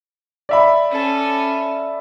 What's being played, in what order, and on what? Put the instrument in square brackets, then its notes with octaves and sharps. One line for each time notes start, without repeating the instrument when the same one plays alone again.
[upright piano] D5 E5 B5
[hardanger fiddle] C#4 A4